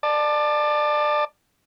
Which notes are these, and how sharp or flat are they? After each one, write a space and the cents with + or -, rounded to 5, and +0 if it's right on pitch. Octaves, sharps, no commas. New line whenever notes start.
D5 +25 A5 +0